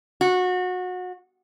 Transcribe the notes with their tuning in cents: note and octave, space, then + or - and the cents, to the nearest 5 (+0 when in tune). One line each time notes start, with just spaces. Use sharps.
F#4 -25